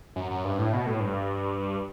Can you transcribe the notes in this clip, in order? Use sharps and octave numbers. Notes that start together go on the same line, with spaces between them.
F#2
F#2
G2
A2
B2
A2
G2